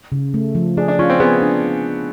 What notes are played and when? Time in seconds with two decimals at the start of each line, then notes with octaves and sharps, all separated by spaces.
0.12 C#3
0.34 A3
0.55 F3
0.77 D4 G#4
0.88 D4
0.99 C#4 F4
1.10 C4
1.20 B3 G#4
1.42 D4